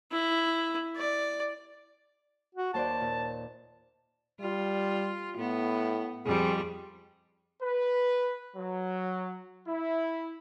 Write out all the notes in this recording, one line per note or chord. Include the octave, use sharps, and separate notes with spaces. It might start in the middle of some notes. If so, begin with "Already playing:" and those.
E4
D5
F#4
D#2 C5 D5 A5
A#2
G3 F4
A2 B3
F2 G3 G#4
B4
F#3
E4